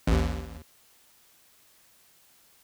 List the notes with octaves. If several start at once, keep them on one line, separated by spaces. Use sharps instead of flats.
A1 D#2